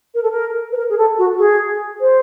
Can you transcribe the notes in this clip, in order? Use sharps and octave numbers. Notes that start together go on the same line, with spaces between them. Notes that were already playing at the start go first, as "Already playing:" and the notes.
A#4
A4
A#4
B4
A#4
G#4
A4
F#4
G#4
C5